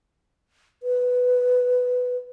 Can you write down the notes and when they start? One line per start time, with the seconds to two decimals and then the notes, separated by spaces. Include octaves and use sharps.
0.83 B4